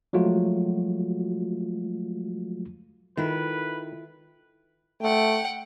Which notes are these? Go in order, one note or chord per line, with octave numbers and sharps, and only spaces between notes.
F3 F#3 G#3 A3 F4 F#4
D#3 E4 F4 A4 B4
A3 F#5 G5